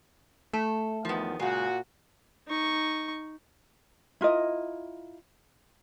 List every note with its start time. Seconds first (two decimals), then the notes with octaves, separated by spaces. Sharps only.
0.53 A3 A4
1.05 E2 D#3 F3 B3
1.39 A#2 C#3 G#3 F#4
2.48 D#4 C#6
4.21 E4 F4 A#4 D#5